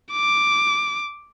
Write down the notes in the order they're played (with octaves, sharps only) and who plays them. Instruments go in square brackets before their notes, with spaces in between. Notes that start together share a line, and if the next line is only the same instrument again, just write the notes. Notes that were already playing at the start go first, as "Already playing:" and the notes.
[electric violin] D6